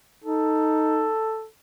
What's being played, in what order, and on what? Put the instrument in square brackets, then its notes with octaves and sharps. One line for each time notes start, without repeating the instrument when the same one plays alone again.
[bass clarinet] D#4 [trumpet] A4